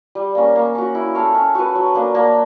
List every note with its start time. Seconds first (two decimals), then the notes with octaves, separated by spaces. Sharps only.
0.15 G3
0.35 A#3 C#4
0.55 A#3
0.75 C#4 F#4
0.95 E4
1.15 A4 C#5 F5
1.35 C#4
1.55 F#4 B4
1.75 F#3
1.95 A#3 D4
2.15 A#3